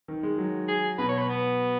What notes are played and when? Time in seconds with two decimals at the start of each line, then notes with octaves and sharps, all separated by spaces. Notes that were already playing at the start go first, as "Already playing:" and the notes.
0.08 D#3
0.23 G#3
0.38 F#3
0.68 G#4
0.98 B2 B4
1.09 C#5
1.18 B4
1.29 B3